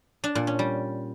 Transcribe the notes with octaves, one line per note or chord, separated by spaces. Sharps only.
D4
A#2
C#4
G3